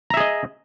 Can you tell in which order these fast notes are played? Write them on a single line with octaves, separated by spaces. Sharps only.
A#5 E5 G#4 D#5